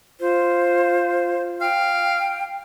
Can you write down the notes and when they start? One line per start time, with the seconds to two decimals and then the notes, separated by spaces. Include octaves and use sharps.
0.20 F4 C5
1.61 F5 G5